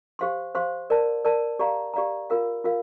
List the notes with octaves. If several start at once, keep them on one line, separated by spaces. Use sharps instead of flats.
G4 C5 F5 C6
G4 C5 F5 C6
A#4 D5 A5
A#4 D5 A5
G4 D5 F5 A#5
G4 D5 F5 A#5
F4 A#4 F5
F4 A#4 F5